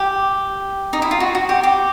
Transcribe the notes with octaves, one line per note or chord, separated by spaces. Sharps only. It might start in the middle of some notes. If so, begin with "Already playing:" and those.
Already playing: G4
D#4
E4
F4
F#4
F#4
G4
G4